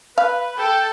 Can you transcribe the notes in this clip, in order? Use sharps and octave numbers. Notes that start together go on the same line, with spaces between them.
B4 F5
A4 G5